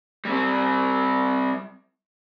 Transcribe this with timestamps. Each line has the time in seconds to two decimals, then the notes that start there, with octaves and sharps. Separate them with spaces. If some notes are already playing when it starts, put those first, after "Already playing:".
0.25 G3 C4